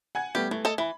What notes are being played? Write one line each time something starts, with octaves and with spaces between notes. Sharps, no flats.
F#5 G#5 G#6
G3 A3 B3 G4
E3 A3
A4 D#5 A5
E3 B5